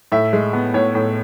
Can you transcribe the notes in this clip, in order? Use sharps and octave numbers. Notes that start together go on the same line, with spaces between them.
A2 E5
G#3
B3
A2 C#5
A2